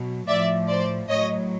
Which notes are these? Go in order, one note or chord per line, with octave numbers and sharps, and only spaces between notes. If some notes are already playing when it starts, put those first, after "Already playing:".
Already playing: B2 F#3
A2 F3 D5 E5
C5 D5
A2 F#3 C#5 D#5